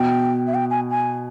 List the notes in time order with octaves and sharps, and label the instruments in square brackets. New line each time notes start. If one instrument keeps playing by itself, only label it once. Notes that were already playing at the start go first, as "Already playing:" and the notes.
Already playing: [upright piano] B2 [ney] G5
[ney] E5
G5
G#5
G#5